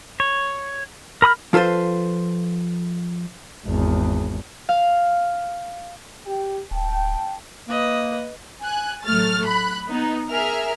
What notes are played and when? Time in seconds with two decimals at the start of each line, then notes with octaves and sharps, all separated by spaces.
0.20 C#5
1.22 A#4 B5 D#6 F6
1.53 F3 F4 A4 B4 C5
3.66 G#1 E2
4.69 F5
6.26 G4 G5
6.71 D1 G5 A5
7.68 A#3 B4 D#5
8.62 G#5 F#6
9.04 A1 F#3 A3 F6 A6
9.46 B5 F#6
9.90 B3 D#4
10.29 G#4 A#4 E5 F6